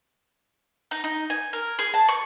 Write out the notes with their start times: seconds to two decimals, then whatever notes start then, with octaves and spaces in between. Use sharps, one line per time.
0.91 D#4
1.04 D#4
1.30 G#5
1.53 A#4
1.79 G#4
1.94 A5
2.09 C#6